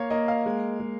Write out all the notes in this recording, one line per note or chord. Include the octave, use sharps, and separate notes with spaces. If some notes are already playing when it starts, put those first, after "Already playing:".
Already playing: A#3 C#5 F5
A#3 D#5
F5
G#3
G#3